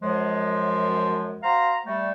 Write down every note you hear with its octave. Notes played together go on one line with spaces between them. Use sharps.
F#2 F3 G#3
F#4 C5 F5 A#5
G3 A3